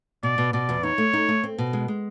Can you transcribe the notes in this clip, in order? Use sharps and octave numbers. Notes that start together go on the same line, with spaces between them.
B2 D5
B2
B2 D5
E2
D#4 C#5
A3
D#4
A3
C4
B2
G#3
G#3